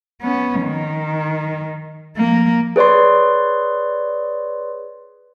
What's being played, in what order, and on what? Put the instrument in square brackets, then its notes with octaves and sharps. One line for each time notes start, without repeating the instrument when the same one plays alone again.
[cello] B3 C#4
D#3
F3 A#3
[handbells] G#4 B4 C#5 D5 C6